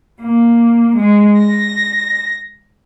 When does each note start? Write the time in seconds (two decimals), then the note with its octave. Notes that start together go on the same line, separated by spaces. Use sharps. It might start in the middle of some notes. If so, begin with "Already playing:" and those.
0.21 A#3
0.98 G#3
1.38 A#6